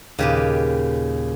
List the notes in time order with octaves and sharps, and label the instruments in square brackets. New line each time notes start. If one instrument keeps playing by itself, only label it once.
[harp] D#2 A#2 [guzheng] C#3 G4 B4